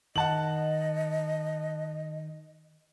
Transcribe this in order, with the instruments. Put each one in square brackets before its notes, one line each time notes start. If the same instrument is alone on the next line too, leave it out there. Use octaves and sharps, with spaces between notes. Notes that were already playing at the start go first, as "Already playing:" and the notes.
[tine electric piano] D#3 [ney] D#5 [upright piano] F#5 A5 F#7